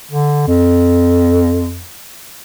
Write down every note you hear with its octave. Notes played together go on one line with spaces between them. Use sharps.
D3
F2